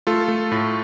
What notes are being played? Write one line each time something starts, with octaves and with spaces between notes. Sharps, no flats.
A3 F4 A4
A3
A2